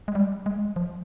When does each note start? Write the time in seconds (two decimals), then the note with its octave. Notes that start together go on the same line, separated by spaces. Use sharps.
0.08 G#3
0.15 G3
0.46 G#3
0.76 F3